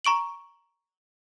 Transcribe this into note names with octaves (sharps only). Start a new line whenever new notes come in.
A#5 C#6 D7 F#7